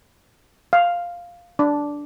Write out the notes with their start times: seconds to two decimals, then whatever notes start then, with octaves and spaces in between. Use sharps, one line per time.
0.73 F5
1.59 D4